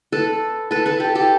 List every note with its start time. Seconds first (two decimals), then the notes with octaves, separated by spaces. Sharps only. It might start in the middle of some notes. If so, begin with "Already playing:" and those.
0.12 A4 B4
0.71 A4 B4
0.86 A4 B4
1.00 G4 A4
1.15 G4 A4